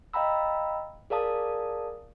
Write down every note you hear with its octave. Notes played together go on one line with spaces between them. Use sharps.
D#5 F5 G5 A#5 B5 E6
G#4 A#4 D5 F5 A5 D#6